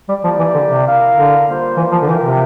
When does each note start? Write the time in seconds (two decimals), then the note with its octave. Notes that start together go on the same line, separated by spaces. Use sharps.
0.09 G3
0.24 F3 A#3 E4 G4 D5
0.39 E3
0.54 D3
0.70 C3
0.86 E4 A#4 F5
1.16 D3
1.46 G3 A#3 F4 C5
1.77 E3
1.92 F3
2.02 D3
2.08 E3 A#3 F4 A#4 E5 G5
2.23 C3